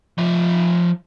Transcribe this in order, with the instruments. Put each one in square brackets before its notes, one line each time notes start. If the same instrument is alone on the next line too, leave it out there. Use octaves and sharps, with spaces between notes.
[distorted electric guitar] F3 E5